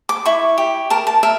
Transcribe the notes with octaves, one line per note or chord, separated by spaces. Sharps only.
D6
E4 C#6
G4
A#4 A5
A5
A#4 E5